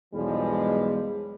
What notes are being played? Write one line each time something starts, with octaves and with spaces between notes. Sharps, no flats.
B1 E2 F3 G3 G#3